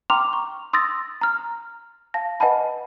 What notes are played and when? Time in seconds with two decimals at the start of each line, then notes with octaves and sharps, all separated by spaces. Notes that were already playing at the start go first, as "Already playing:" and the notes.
0.10 G5 A#5 C6 D6 F6 F7
0.33 C#6
0.73 C6 D#6 E6 A6 A#6
1.21 A#5 F6
2.14 F5 A5 A#6
2.40 B4 D#5 F#5 G#5 A5 B5